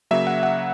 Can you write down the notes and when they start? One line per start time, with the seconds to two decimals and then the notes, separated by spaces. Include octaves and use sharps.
0.11 C#3 F#3 A#3 E5
0.27 F#5
0.43 F#5